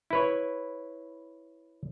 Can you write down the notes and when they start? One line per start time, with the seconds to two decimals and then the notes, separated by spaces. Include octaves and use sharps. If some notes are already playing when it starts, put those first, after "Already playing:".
0.11 E4 B4 C#5